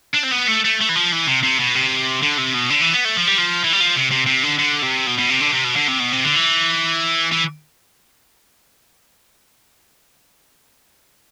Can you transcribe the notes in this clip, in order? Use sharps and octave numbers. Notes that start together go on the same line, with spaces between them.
D4
C4
B3
A3
A3
A3
E3
F3
E3
C3
C3
B2
C3
D3
C3
B2
D3
E3
B3
A3
F3
G3
F3
E3
G3
F3
C3
C3
C3
D3
D3
C3
B2
B2
C3
D3
C3
B2
D3
C3
B2
C3
D3
E3
E3